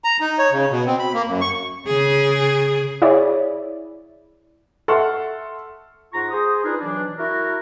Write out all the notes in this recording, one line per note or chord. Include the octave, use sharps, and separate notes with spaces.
A#5
D#4
C#5
C#3
B2
C4
B5
A#3
F#2
C#6
C#3 G#4
E4 G#4 C#5 D5 E5
A4 E5 F#5 C6 C#6 F6
G#2 F4 F#5 A#5 C#6
G#4 C5 D#6
D4 D#4 F4 G#4 A#4 B4
B2 E3 F#3 D4
E4 F#4 A#4